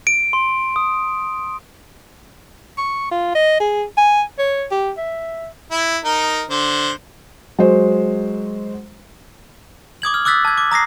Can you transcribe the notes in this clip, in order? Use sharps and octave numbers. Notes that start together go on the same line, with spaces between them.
D7
C6
D#6
C#6
F4
D#5
G#4
G#5
C#5
G4
E5
E4
D#4 A#4
D3 C5
F#3 G#3 C5
D6 D#6 G#6 F#7
F6
D6 E6 F#6 A6 B6
A5 G#6
D6
A#5 D#6 A#6 C7